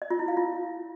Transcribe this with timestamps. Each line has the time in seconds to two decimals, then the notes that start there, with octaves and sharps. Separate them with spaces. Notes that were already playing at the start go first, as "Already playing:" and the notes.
0.02 D#5
0.10 F4
0.19 E4
0.28 F5
0.37 F4